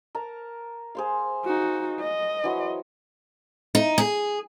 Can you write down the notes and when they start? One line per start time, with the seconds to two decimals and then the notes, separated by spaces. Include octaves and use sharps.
0.15 A#4 A5 A#5
0.95 G#4 C5 F5
1.45 D#4 F#4
2.00 D#5
2.44 E3 F#3 C6
3.75 D#4
3.98 G#4